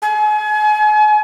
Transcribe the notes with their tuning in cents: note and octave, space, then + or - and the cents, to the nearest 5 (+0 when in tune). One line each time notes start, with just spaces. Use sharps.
G#5 +35